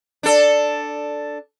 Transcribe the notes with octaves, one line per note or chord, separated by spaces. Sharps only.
D4 A4